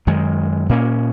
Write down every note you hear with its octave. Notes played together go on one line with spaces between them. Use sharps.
F#2 D#3 G#3
A#2 A#3 C#4